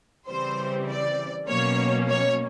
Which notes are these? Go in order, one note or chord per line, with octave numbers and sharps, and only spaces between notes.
C#3 E3 G3 C4 C5
D5
B2 F#3 A#3 C#4 C#5
C#5